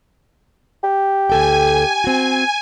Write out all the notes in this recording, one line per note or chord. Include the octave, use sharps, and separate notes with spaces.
G4
D2 A4 G5 G#5
C4 F#4